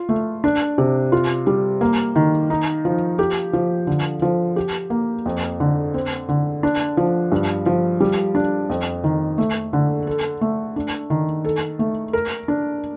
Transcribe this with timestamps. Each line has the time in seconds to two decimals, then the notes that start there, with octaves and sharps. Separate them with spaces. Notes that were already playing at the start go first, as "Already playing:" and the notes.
Already playing: F4
0.09 A3
0.44 D4
0.78 C3
1.12 F4
1.47 G3
1.81 A#3
2.16 D#3
2.50 D#4
2.85 F3
3.19 G4
3.53 F3
3.87 D3
4.22 F3
4.56 G4
4.90 A#3
5.26 F2
5.60 D3
5.94 C4
6.29 D3
6.63 D4
6.97 F3
7.32 G2
7.66 F3
8.00 G3
8.35 D4
8.69 F2
9.04 D#3
9.38 A3
9.73 D3
10.07 A4
10.41 A3
10.76 D4
11.10 D#3
11.45 A4
11.79 A3
12.13 A#4
12.48 D4